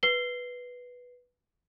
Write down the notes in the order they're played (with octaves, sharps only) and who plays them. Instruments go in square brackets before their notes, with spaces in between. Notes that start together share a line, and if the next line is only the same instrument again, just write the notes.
[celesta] B4 C7 G7